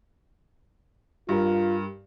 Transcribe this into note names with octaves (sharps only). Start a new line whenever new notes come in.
G2 F4 A#4